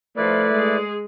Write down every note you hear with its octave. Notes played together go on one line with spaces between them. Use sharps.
F3 A3 E4 B4 D5
G#3 G#4